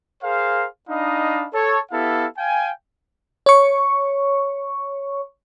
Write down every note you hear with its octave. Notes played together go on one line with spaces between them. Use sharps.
G#4 A#4 C5 F5
D4 D#4 D#5 F5 B5
A4 C#5
B3 E4 G4 A4 F5
F5 G5 G#5
C#5 C#6